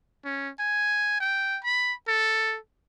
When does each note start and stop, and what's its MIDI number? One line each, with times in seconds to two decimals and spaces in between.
0.25 0.50 61
0.60 1.17 80
1.20 1.59 79
1.64 1.94 83
2.08 2.58 69